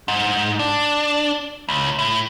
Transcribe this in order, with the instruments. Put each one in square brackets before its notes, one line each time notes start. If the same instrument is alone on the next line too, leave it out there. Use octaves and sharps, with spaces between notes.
[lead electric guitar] G#2
D4
C#2
A2